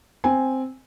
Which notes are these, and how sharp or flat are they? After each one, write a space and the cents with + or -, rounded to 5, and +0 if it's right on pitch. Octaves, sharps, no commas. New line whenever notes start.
C4 +0 G#5 +0